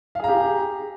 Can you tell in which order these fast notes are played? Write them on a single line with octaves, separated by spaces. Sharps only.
F5 G#4 A#5 G4